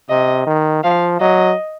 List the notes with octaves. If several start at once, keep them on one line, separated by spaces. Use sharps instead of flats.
C3 D#5
D#3
F3 F5
F#3 D#5